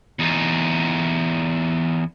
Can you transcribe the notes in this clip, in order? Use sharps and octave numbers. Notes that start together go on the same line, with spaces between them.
E2 D#4